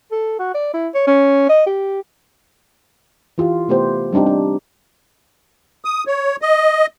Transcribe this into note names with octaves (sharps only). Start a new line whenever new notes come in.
A4
F#4
D5
E4
C#5
C#4
D#5
G4
E3 F4 G4
C3 A3 B3 G4 C5
G3 C4 D4 D#4 G4
D4
D#6
C#5
D#5